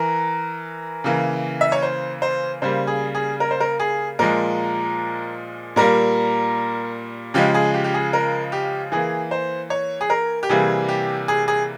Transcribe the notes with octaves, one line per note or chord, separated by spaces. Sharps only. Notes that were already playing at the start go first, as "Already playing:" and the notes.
Already playing: E3 A#4
C#3 E3 A#3
E5
C#5
C5
C5
C#3 G3 A#3 C5
G#4
G#4
A#4
C5
A#4
G#4
A#2 F3 G#3 A#4
A#2 G3 A#3 A#4
C#3 F3 G#3 G4
G#4
G4
G4
G#4
A#4
G4
E3 A#3 G#4
C5
C#5
G#4
A#4
G4
C3 E3 G3 A#3 G#4
G4
G#4
G#4